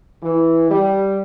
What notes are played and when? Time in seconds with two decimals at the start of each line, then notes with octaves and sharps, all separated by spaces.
0.22 E3
0.70 G3